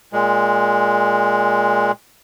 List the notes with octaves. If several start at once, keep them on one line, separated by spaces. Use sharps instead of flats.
A#2 G#3